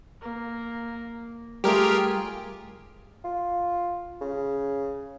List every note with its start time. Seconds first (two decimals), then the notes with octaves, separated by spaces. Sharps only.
0.22 A#3
1.64 G3 A3 F4 G4 G#4 A#4
3.25 F4
4.21 C#3